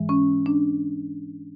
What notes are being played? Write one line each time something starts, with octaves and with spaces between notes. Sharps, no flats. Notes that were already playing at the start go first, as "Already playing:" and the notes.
Already playing: G#2 E3 G#3
C#4
D4